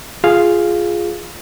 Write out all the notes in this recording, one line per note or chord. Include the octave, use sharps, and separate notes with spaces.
F4 G#4 F5